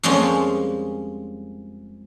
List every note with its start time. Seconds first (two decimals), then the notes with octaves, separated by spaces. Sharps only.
0.03 F2 F3 G3 G#3 A#3 C#4